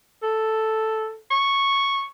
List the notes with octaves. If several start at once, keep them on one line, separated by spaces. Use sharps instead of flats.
A4
C#6